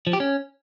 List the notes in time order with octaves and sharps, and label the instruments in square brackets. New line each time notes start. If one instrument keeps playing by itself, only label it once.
[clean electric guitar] F3
G4
C#4